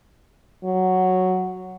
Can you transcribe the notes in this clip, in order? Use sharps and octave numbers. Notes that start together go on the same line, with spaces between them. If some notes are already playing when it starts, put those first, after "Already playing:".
F#3